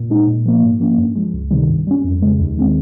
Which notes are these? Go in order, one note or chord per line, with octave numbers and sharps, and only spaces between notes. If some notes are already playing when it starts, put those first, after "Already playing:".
Already playing: A#2
G#3 D#4
A#2
F3 A#3
G#2
F3 A#3 C#4
G2
F3 G#3
C#2
C3 D#3 G3
G2
G3 C#4
F2
C#3 G#3
D#2
D#3 G#3 C4